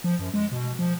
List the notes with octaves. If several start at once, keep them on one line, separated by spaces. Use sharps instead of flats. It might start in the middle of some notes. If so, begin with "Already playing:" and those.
F3
F#2
G#3
B2
F3